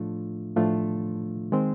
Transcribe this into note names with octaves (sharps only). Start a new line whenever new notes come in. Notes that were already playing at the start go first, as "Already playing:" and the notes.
Already playing: A2 F3 A3 D4 F4
A2 F3 A3 D4 F4
D#3 G#3 C4